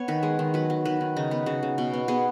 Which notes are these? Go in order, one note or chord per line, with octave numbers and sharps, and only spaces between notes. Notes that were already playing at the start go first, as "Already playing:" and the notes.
Already playing: B3 C#5
D#3 B4
G#3 G#4
D#3
F#3 B4
F#3
D#3 B4
D#3
C#3 D#4
B3 B4
C#3 F#4
C#3
B2
B3
B3 G#4